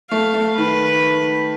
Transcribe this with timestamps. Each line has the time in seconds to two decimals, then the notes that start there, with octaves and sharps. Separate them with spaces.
0.11 A3 F5
0.34 A3
0.57 D#3 B4